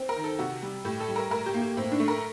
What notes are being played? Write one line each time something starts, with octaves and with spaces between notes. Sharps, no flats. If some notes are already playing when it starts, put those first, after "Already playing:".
Already playing: C4
A#4
D#3
A4
C3 F#4
G3
A2 G4
A4
G3
A#4
A2 A#4
G4
A#3
G4
A2 C4
D4
A3
A#4